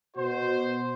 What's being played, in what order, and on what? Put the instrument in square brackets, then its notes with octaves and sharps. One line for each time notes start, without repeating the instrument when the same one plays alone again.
[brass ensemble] B2 F#4 C5